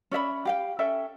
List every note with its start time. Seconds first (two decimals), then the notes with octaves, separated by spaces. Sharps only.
0.11 C#4 D5 E5 B5
0.45 G4 F5 G5
0.79 C#4 A4 E5 G5